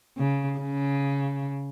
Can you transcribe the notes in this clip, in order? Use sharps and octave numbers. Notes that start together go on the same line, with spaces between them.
C#3
C#3